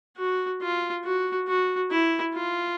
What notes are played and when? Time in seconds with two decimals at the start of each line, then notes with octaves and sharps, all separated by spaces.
0.18 F#4
0.61 F4
1.04 F#4
1.47 F#4
1.90 E4
2.34 F4